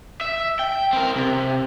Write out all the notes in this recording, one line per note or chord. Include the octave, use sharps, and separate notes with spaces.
E5
G5
C4 A#4
C3